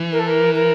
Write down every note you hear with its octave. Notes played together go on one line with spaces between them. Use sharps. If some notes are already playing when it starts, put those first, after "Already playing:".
Already playing: E3
A#4
A4
A#4
A#4